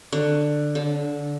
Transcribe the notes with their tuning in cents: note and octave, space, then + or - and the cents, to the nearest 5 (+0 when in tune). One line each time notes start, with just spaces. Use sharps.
D3 +10
D3 -20